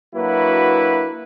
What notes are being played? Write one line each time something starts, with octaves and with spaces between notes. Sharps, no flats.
F#3 A#3 D4 E4 F#4 B4